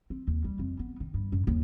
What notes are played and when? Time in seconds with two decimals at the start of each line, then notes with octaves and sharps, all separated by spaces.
0.10 C4
0.27 D#2
0.44 G3
0.59 F2
0.79 B3
1.00 D#3
1.14 G2
1.32 F#2
1.47 D#2